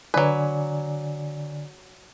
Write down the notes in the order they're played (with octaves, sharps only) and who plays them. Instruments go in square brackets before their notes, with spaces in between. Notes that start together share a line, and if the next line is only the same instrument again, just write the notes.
[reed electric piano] D3 D5 G#5 [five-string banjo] F#3 B4